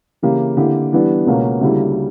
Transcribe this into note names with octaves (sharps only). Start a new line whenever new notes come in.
C#3 E3 A#3 E4 G4
D3 A#3 E4 G4
E3 G3 B3 D4
C#2 B2 A#3 C#4
D2 C#3 G3 A#3 E4